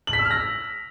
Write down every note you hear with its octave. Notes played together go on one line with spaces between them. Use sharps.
F#7
B6
E6
F6
A#6